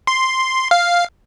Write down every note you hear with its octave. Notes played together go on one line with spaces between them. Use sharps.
C6
F5